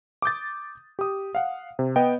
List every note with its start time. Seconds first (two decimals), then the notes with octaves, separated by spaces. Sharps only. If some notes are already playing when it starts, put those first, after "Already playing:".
0.22 D6 D#6 G6 A6
0.99 G4 D#6
1.35 F5 F#5
1.79 C3
1.96 B3 D#5 G5